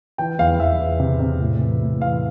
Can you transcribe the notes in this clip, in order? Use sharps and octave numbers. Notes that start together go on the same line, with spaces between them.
E3 G5
E2 F5
E2 E5
E2
C3
C3
A2
E3
A2
E3 F5